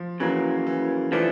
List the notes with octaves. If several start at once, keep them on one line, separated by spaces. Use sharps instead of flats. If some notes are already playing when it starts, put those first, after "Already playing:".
Already playing: F3
C#3 E3 F#3 A#3
E3
E3 F3 A3 D4